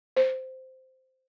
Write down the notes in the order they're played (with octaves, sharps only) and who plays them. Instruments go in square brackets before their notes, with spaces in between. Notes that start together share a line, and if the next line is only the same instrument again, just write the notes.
[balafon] C5